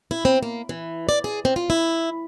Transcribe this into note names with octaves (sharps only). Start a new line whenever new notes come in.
E4
C4
A#3
E3
D5
G#4
C4
F4
E4